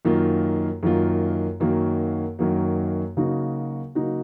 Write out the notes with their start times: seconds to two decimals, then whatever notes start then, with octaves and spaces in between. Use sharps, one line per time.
0.05 F#2 D#3 A#3 F4
0.83 F#2 D#3 A#3 F4
1.60 F#2 D#3 F#3 A#3
2.39 F#2 D#3 F#3 A#3
3.17 C#3 F#3 A#3 D#4 F#4
3.95 C#3 F#3 A#3 D#4 F#4